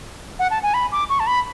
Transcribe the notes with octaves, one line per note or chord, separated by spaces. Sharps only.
F#5
A5
G#5
B5
D6
C#6
A5
B5